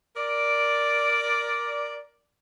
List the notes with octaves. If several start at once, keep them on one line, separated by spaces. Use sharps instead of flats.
A#4 D5